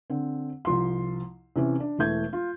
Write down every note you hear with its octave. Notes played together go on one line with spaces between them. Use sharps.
D3 C4
C2 F3 C6
C3 E3 C#4
D4
E1 E3 A3 G6 G#6
F4